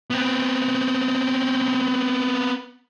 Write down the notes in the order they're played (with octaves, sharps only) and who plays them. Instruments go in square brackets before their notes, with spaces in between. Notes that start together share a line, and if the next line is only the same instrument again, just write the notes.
[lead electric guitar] B3 C4